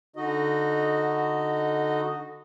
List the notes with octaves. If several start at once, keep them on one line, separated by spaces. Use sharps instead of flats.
D3 D#4 F#4 D#5